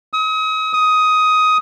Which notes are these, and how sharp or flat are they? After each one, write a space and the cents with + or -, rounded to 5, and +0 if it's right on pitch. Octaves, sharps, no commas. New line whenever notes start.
D#6 +40
D#6 +15